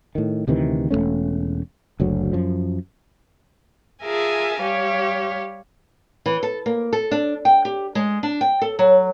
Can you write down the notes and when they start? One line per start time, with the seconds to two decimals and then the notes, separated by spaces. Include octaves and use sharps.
0.15 A2 D#3
0.47 D2 C3 D#3 E3
0.91 E1 G#2 A3 C#4
2.00 F#1 D2 F#3
2.33 F#2 F3
4.02 F4 G#4 A#4 E5 G#5 A5
4.61 G3 G4 C#5 F5
6.26 E3
6.43 A4
6.66 A#3
6.93 A4
7.11 D4
7.45 G5
7.65 G4
7.95 G#3
8.23 D4
8.41 G5
8.62 A4
8.79 F#3